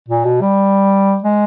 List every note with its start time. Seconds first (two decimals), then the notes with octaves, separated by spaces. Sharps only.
0.08 A#2
0.25 B2
0.41 G3
1.24 G#3